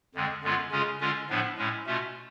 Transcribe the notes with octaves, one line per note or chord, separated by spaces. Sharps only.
F2 D3 G#3
F#2 D3 G#3 B3 F4
C#3 G#3 C#4 F4
D3 G#3 C#4 F4
A2 F3 B3 D4
A2 G#3 C#4
B2 A3 C#4 F4